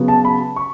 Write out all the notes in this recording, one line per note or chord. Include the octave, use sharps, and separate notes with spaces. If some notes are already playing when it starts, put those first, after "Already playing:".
Already playing: C#3 F#3 B3
A5
B5
C#6